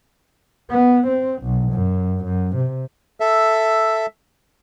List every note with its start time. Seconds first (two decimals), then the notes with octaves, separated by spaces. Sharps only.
0.70 B3
1.07 C4
1.42 B1
1.73 F#2
2.24 F#2
2.55 C3
3.20 A4 E5